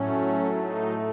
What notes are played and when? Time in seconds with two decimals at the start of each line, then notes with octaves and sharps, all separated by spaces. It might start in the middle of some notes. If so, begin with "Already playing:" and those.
Already playing: A2 F#3 A3 C#4
0.56 D#4